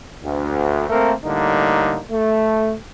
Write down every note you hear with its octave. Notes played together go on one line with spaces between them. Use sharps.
D2
A3 A#3 C4 A4 A#4
A2 D3 G3 A#3 D#4
A3